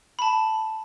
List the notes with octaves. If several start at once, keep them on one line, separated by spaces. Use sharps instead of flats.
A5 B5